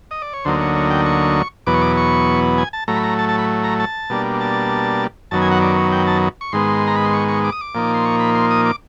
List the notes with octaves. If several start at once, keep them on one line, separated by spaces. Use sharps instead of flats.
D#5
D5
C#5
D2 D3 F#3 A#3 D#4 C5
C#5
C#5
G5
C#6
E2 B2 F#3 B3 D6
C#6
D6
C#6
G#5
A5
A2 F#3 A3 A#5
B5
A#5
A5
A5
B5
A#5
A5
B2 G3 A#3 D4
A5
F#2 D#3 F#3 B3 A5
G#5
F#5
D5
C#5
G5
A5
C#6
G#2 D#3 G#3 B3 C6
A#5
B5
C6
C#6
C#6
D6
D#6
D6
A#2 F3 A#3 D#4
C6
C#6
B5
C6
D#6
D6